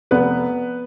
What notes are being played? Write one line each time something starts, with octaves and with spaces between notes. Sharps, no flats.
F1 B3 B4